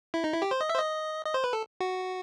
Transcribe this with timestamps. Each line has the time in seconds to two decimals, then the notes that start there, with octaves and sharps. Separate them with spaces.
0.14 E4
0.24 D#4
0.33 E4
0.42 G4
0.51 C5
0.61 D#5
0.69 E5
0.75 C5
0.79 D#5
1.25 D#5
1.34 C5
1.44 B4
1.53 A4
1.80 F#4